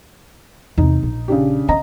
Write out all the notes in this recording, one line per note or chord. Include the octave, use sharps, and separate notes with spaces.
E2 C3 D#4
A#1
C#3 D4 G4
C#4 D#5 A#5